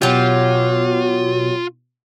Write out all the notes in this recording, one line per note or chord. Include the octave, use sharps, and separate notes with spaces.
B2 F#3 F4 G4